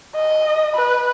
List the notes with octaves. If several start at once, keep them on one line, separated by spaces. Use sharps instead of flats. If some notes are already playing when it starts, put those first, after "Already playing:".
D#5
B4